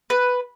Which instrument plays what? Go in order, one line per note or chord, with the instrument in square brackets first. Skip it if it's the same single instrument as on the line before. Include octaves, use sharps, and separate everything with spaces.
[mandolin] B4